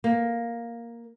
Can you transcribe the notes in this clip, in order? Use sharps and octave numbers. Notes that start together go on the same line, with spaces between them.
A#3